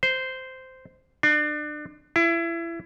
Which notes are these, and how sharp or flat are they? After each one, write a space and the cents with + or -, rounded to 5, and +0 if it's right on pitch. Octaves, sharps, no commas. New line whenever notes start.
C5 -10
D4 +30
E4 +25